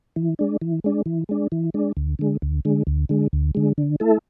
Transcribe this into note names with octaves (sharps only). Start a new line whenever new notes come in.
E3
G#3 D4
E3
G#3 D4
E3
G#3 D4
E3
G#3 D4
D2
D3 G#3
D2
D3 G#3
D2
D3 G#3
D2
D3 G#3
D3
A3 E4 A4